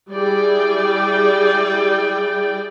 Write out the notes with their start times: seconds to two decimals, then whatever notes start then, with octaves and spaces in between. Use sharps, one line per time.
0.12 G3 E4 G#4 D5 G5